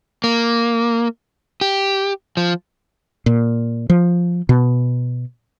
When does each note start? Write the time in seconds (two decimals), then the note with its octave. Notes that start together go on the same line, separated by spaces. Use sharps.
0.24 A#3
1.61 G4
2.37 F3
3.26 A#2
3.90 F3
4.49 B2